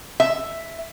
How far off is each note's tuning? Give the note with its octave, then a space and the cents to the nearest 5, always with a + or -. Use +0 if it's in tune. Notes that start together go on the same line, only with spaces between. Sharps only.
E5 +5